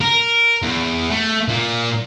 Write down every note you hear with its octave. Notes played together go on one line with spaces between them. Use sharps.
A#4
E2
A3
A#2